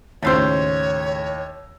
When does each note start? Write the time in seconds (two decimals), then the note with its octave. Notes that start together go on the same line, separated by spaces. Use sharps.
0.23 D#2 A2 C#3 A3 F4 C5 C#5 E6